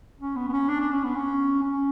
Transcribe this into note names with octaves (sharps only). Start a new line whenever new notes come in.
C#4
B3
B3
C#4
D4
D4
C#4
B3
C#4
C#4